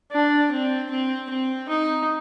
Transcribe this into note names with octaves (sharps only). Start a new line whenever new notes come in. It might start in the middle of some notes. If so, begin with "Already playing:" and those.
D4
C4
C4
C4
D#4